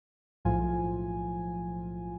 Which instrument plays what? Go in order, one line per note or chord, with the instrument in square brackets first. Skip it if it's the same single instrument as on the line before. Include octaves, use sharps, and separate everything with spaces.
[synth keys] B1 A2 F3 F4 G#5